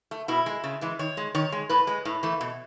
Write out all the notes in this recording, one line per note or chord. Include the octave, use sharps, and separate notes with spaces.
A3
B2 E4
G#3
C#3
E3 G#3
D#3 C#5
G#3
D#3 C#5
G#3
A2 B4
G#3
A2
E3 A3
B2